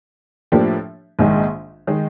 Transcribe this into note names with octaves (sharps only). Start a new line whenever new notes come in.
A2 F3 A#3 D4 G4
A#1 G#2 D#3 G#3
D#3 G#3